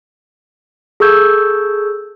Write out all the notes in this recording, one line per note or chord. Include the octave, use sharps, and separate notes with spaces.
G#4 A4 C#6 E6 G6 G#6